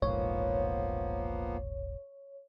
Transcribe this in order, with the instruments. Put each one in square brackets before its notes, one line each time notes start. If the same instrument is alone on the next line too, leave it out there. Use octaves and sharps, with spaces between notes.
[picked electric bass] E1 A#1 G#2 [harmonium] F3 A#3 B3 [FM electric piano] C#5